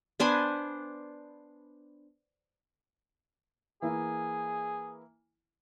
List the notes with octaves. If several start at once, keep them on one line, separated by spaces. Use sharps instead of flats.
B3 D4 C5 G#5
E3 A#3 E4 G#4